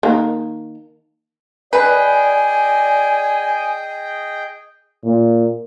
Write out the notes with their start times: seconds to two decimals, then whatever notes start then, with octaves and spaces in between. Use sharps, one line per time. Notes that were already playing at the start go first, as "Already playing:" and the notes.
0.03 D#3 A#3
1.73 G#4 B4 D5 D#5 G5 G#5
5.04 A#2